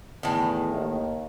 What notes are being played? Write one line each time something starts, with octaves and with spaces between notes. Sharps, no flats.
E2 A2 D#3
D#2